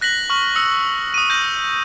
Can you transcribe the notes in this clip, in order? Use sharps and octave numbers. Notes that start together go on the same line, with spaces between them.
F#6 A#6 B6 F#7
C#6 F6 F#7
D#6 E6 C#7
D#6 D#7
F6 G6 A#6 F#7